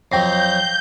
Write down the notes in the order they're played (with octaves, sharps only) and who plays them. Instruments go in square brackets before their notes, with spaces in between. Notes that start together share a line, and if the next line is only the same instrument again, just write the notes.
[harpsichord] F2 F#3 [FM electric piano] G5 A#6 C7 [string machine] G6